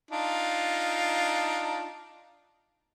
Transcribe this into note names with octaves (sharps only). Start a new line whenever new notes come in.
D4 D#4 F4